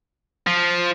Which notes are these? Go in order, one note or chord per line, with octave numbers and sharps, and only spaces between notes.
F3